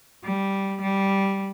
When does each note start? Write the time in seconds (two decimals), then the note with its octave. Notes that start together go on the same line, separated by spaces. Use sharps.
0.25 G3
0.82 G3